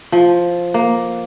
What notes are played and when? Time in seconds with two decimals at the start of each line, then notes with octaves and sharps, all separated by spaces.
0.12 F3
0.74 A#3